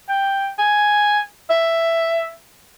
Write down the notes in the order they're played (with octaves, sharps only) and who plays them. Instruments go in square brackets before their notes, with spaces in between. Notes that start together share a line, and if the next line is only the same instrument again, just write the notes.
[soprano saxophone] G5
G#5
E5